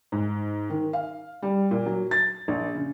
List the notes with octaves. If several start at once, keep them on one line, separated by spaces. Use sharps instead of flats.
G#2
D#3
F5
G3
A#2
F#3
A6
A#1
C#3